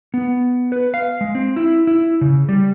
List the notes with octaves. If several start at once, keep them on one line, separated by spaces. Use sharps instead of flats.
B3
B4
F5
G#3
C4
E4
E4
C#3
G3